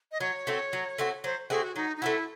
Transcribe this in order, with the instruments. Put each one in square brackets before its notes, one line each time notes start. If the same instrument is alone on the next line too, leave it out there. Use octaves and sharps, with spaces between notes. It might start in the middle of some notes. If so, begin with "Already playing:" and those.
[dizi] D#5
[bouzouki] F#3 [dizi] C#5
[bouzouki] A3 C4 F#4
F#3
A3 C4 F#4
[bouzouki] F#3 [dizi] C5
[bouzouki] A3 C4 F#4 [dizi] G#4
[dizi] F#4
[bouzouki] F#3 [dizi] D#4
[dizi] D#4
[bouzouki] A3 C4 F#4 [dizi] E4